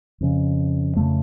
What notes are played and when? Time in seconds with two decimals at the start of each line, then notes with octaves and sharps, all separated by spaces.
0.21 F2 C#3
0.97 F2 C#3 A3